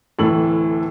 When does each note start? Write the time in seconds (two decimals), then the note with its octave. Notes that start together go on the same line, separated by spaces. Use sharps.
0.18 D1 A2 E3 A4 F#7